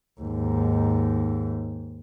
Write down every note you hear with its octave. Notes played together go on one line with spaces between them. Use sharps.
D#2 G#2